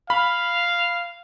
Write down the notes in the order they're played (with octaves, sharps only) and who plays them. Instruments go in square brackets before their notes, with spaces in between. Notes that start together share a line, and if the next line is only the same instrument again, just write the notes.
[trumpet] F5 [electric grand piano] B5